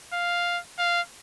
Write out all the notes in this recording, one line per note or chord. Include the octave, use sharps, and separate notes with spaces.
F5
F5